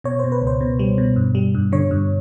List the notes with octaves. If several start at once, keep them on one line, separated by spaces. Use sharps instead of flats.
B2 C#5
B2 C5
B4
C#2
C5
B2
G3
B2
G2
G3
G2
D3 C#5
G2